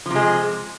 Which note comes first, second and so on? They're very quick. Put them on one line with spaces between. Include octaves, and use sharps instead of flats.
F3 C3 G#3